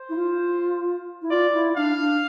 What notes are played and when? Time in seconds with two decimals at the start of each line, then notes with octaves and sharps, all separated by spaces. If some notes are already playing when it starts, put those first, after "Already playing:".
Already playing: C5
0.09 E4
0.15 F4
1.21 E4
1.30 F4 D5
1.53 E4
1.76 D4 F5
1.99 D4